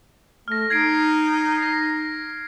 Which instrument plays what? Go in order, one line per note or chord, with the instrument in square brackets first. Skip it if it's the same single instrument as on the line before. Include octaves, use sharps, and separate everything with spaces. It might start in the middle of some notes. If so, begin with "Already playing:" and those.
[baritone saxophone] A3 [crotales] F6 A#6
[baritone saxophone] D#4 [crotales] G#6 C7 D7
[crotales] A#6 C7